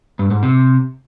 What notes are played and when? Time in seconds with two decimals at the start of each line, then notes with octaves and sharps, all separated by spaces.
0.19 G2
0.31 G#2
0.43 C3